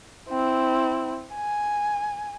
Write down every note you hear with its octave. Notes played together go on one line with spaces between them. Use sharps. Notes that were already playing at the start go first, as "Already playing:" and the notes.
C4 E4
G#5